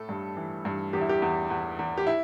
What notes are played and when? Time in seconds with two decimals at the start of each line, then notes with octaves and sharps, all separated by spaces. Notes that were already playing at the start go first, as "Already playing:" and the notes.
Already playing: A2 A3 A4
0.09 G2
0.37 E3
0.65 G2
0.93 E2 G4
1.01 E4
1.09 G4
1.22 E2
1.50 E2
1.79 E2
1.97 G4
2.07 E4